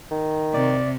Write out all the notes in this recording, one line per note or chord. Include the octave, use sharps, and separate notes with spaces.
D#3
C3 D5